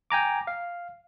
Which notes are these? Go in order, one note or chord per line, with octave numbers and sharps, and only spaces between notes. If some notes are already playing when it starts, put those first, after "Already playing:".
G5 G#5 A#5 D6
F5